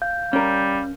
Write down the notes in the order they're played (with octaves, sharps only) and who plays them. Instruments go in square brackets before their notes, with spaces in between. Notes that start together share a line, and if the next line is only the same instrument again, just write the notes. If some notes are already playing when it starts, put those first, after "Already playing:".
[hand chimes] F5 G6
[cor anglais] G3 [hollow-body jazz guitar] C#4 A#4